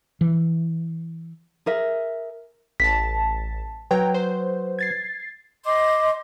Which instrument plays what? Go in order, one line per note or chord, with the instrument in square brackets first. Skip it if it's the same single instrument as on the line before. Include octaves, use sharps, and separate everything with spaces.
[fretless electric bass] E3
[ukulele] G#4 A#4 E5
[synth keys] A1 A5 [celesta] B6
[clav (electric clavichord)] F#3 [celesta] B4 [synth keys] G5 A#5 G#6
[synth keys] C5
G#6 A6 C7
[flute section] D#5 C6 D6